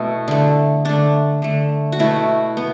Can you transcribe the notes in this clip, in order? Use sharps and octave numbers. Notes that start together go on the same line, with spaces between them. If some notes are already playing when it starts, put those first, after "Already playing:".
Already playing: B2 A3 E4
D3 A3
D3 A3 D4
D3 A3
F#4
B2 A3 E4
B3